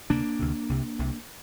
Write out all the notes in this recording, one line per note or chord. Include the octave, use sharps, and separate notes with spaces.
D2 C3 A#3 D4
D2 C3
C2 C3
C2 C3